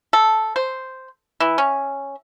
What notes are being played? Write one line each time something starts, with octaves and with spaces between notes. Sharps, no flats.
A4
C5
E3
C#4